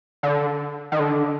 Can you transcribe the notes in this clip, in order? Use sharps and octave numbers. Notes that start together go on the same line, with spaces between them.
D3
D#3
D3